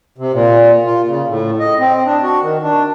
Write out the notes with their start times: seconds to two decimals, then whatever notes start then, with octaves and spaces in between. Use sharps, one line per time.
0.18 C3
0.33 A#2
0.86 F4
1.07 C#3
1.28 A2
1.60 D#5
1.79 C4
2.06 D4
2.23 F#4
2.43 D#3
2.62 D4